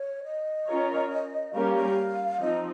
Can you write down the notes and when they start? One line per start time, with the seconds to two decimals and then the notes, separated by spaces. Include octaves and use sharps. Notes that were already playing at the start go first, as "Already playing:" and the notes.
Already playing: C#5
0.24 D#5
0.67 C#4 F4 A#4 C#5
1.54 G3 A#3 C#4 G4 A#4 F5
1.75 F5
2.40 F3 C4 D#4 D#5